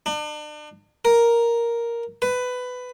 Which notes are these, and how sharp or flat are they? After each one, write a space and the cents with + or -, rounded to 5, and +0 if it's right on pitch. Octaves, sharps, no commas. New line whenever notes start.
D4 +40
A#4 +5
B4 +15